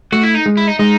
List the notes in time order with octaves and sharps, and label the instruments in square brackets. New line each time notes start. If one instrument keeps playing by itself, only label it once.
[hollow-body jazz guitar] A3 [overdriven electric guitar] F#4
[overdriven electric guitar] E4
D#4
[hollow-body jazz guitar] G#3
[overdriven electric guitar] E4
D#4
[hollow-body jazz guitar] G#3 [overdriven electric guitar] D#4